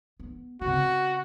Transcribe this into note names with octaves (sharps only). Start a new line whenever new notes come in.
B3
C#3 C4 F#4